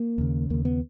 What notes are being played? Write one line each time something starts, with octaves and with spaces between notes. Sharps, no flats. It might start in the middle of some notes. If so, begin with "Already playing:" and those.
Already playing: A#3
D#2 C#3
D#2 C#3 A#3
B3